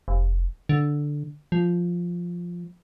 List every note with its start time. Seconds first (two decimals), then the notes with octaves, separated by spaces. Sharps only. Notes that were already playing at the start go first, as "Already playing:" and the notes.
0.08 F1
0.69 D3
1.52 F3